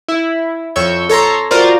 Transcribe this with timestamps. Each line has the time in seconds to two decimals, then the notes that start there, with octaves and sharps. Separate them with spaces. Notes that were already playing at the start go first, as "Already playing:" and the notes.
0.08 E4
0.76 F2 C#5 C#6 E6 G6
1.09 A4 C#5 A#5 C6
1.51 F4 F#4 A#4 C5 D5